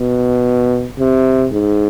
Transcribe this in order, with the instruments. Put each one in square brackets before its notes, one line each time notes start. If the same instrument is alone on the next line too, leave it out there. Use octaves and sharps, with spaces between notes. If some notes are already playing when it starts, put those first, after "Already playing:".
Already playing: [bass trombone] B2
C3
G#2